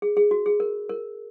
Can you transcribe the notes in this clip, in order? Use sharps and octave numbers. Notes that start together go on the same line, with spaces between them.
G#4
G#4
F#4
G#4
A#4
A#4